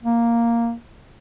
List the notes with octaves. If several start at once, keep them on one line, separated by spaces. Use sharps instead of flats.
A#3